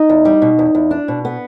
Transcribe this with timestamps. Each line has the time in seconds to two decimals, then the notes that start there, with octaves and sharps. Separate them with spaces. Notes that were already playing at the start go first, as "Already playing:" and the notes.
Already playing: D#4 D#5
0.09 E2
0.25 G3
0.42 B2
0.59 E2
0.75 E2
0.91 D4
1.08 B2
1.25 B3